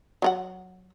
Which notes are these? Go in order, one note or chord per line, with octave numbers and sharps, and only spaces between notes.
F#3 F4 F#5